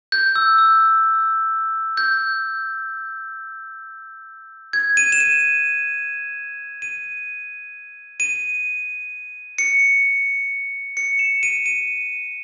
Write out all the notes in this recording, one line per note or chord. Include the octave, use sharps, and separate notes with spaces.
G6
E6
E6
G6
G#6
D#7
E7
D#7
D#7
D#7
C#7
C#7
E7
D#7
D#7